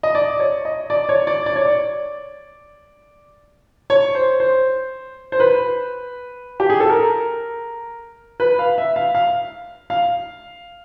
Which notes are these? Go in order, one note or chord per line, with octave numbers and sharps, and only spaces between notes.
D#5
D5
C#5
D#5
D5
C#5
D5
D5
C#5
D5
C#5
C5
C5
C5
B4
G4
G#4
A4
A#4
B4
F5
E5
F5
F5
F5